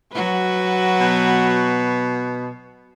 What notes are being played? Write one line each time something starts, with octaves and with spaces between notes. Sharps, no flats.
F#3 F#4 B4
B2